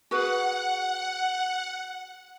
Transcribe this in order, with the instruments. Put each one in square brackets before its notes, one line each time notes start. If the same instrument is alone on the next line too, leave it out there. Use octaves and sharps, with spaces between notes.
[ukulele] F#4 G#4 B4 [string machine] F#5